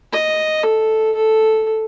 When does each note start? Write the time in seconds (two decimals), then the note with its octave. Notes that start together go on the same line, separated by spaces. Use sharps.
0.12 D#5
0.63 A4
1.15 A4